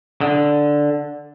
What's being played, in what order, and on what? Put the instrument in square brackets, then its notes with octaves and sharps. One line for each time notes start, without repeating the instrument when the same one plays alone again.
[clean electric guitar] D3